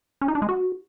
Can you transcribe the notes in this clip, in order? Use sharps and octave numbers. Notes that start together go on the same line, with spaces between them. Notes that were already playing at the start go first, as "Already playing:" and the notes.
C#4
D#4
D4
G#3
F#4